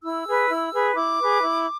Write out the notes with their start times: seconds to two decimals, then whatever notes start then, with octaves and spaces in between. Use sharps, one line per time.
0.03 E4 E6
0.26 G#4 B4
0.49 E4
0.72 G#4 B4
0.95 E4 D6
1.18 G#4 B4
1.41 E4